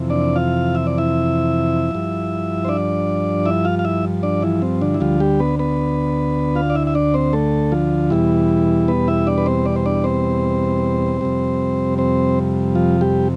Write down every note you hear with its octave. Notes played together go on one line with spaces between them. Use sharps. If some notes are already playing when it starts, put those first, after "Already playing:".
Already playing: F2 C3 E3
D4 D5
F4 F5
E5
D5
E4 E5
G2 F3
C5
D4 D5
E4 E5
F4 F5
F5
E4 E5
D4 D5
E3 E4
C4
D3 D4
E4
D2 D3 F3 G3 F4
G3 G4
B3 B4
B3 B4
F4 F5
D5
E4 E5
E5
D4 D5
C4 C5
A3 A4
F3 F4
E2 B2 E3 G3 E4
B3 B4
E4 E5
D4 D5
B4
C4 C5
D5
C5
D4 D5
C4 C5
F2 C3 G3
C4 C5
F3 F4
G3 G4